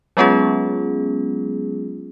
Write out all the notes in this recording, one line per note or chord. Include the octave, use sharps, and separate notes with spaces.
F#3 G#3 B3 C#4 F4 G#4